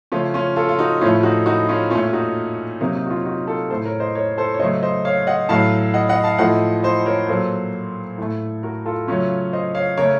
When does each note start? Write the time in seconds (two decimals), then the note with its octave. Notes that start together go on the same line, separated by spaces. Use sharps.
0.12 C#3 F3 A3 C#4 F4
0.34 C#4 F4
0.56 F4 A4
0.69 F4
0.79 D#4 F#4
1.01 A2 F3 A3 C#4 F4
1.23 D#4 F#4
1.46 D#4 F#4
1.69 C#4 F4
1.90 A#2 A3 C#4 F4
2.13 D#4 F#4
2.81 C3 F#3 A#3 D#4
2.95 D#4
3.07 F#4
3.10 C#4 F4
3.25 D#4 F#4
3.48 F4 A4
3.70 A2 A3 A4 C5
3.85 A#4 C#5
4.00 C5 D#5
4.15 A#4 C#5
4.38 A4 C5
4.54 C#5
4.59 C#3 F#3 A3 C5 D#5
4.83 C5 D#5
5.05 C#5 F5
5.27 D#5 F#5
5.49 A2 F#3 A3 F5 A5
5.94 D#5 F#5
6.09 D#5 F#5
6.24 F5 A5
6.39 A2 F3 A3 D#5 F#5
6.84 C5 D#5
7.06 A#4 C#5
7.28 A#2 F#3 A#3 A4 C5
8.18 A2 A3
8.63 F#4 A#4
8.86 F4 A4
9.07 C#3 F#3 A3 C#4 F4
9.53 C5 D#5
9.75 C#5 F5
9.97 C#3 A3 A#4 C#5